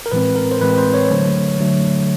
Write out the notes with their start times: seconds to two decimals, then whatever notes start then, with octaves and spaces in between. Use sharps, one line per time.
0.06 A#4
0.12 A2 E3 G#3 C4 B4
0.36 A#4
0.52 C5
0.60 A2 E3 G#3 C4 B4
0.78 C5
0.94 C#5
1.11 D3 F#3 A3
1.60 D3 F#3 A3